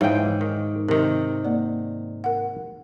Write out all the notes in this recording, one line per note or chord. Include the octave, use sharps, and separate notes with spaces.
G#2 E3 G#4 C#5 E5 F5 G5
D#3
C3 D#3 A#4
A#3 D5
A#4 F#5